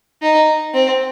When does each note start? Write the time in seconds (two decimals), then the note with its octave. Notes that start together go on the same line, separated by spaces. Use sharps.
0.22 D#4
0.73 C4